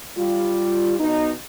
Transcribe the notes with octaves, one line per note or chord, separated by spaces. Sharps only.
G3 F4
B2 D#4